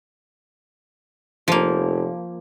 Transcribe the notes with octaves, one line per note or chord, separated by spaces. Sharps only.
F1 F3 A#3